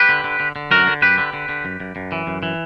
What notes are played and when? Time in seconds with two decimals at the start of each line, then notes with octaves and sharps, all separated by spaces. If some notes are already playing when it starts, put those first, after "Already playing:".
Already playing: G4 B4
0.09 D3
0.24 D3
0.40 D3
0.56 D3
0.71 F#2 F#4 A#4
0.87 D3
1.02 F#2 G4 B4
1.18 D3
1.33 D3
1.49 D3
1.65 F#2
1.80 F#2
1.96 F#2
2.12 E3
2.27 F#2
2.43 E3